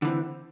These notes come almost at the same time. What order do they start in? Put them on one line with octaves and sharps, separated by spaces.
D3 E3 C4